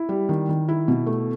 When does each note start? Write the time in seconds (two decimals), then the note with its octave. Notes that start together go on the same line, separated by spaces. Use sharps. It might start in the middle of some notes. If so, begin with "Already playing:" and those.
Already playing: E4
0.09 G3
0.29 D#3
0.49 D#3
0.69 E4
0.88 B2
1.06 A3